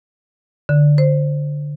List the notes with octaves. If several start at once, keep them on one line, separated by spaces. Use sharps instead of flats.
D3
C5